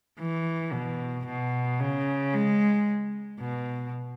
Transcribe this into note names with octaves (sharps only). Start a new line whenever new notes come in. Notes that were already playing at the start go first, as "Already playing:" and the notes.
E3
B2
B2
C#3
G#3
B2